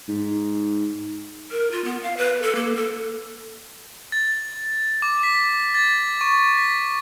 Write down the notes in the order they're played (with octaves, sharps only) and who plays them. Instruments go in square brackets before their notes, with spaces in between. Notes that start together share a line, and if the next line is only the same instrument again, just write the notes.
[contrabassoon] G#2
[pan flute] A#4
F4
B3
F5
B4
A4
A#3
A4
[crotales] A6
D6
B6
A6
C#6
B6